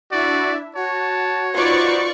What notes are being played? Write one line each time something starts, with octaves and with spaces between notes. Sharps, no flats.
D4 E4 F#4 D5 E5
F#4 C#5 A5
D#4 F4 F#4 B4 C5 D5 C#6